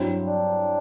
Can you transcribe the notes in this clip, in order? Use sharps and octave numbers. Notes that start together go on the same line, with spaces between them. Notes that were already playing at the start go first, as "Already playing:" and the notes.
Already playing: G2 F#3 C4 E4
D4